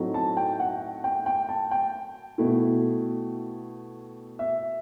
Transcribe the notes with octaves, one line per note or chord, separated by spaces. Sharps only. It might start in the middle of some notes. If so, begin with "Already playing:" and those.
Already playing: A2 F#3 A3 C4 D#4
A5
G5
F#5
G5
G5
A5
G5
B2 A3 E4
E5